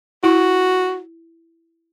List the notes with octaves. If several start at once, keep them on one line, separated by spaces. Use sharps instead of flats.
E4 F#4